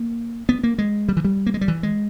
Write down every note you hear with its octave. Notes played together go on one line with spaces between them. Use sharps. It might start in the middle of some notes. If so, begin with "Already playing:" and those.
Already playing: A#3
B3
A#3
G#3
G3
E3
G3
A#3
G#3
G3
E3
G#3